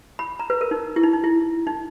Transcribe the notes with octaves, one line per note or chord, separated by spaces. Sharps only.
B5
A#5
B4
A#4
D#4
E4
D#4
D#4
E4
D#4